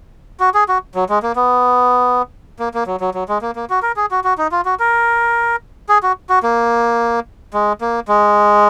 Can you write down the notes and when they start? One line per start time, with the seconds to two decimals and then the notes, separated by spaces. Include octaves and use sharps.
0.40 F#4
0.54 G#4
0.69 F#4
0.95 F#3
1.09 G#3
1.23 A#3
1.36 B3
2.59 A#3
2.74 A#3
2.87 F#3
3.00 F#3
3.14 F#3
3.29 G#3
3.42 A#3
3.56 A#3
3.70 F#4
3.82 A#4
3.96 G#4
4.11 F#4
4.24 F#4
4.38 D#4
4.52 F4
4.65 F#4
4.79 A#4
5.89 G#4
6.03 F#4
6.29 F#4
6.43 A#3
7.54 G#3
7.81 A#3
8.08 G#3